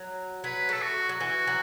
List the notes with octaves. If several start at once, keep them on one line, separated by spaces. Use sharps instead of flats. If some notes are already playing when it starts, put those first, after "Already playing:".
Already playing: F#3
F#3 B4
A3 A4
F#4
F#3
E3 F#4
F#3